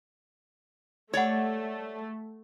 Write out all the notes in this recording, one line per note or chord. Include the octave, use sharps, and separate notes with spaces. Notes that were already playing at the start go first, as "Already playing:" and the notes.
A3 G4 C#5 D5 F#5